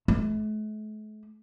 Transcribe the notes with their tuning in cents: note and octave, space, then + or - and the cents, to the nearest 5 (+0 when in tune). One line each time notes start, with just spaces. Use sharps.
A3 -45